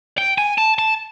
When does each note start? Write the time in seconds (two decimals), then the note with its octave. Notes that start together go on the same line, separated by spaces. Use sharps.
0.18 G5
0.38 G#5
0.58 A5
0.79 A5